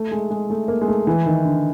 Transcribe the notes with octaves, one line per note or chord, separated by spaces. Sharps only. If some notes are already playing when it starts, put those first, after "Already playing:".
Already playing: A3
G#3
G#3
A3
A#3
G#3
A3
E3
D#3
D3